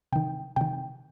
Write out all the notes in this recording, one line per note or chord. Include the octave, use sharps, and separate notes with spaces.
C3 D#3 G5
C3 D#3 G5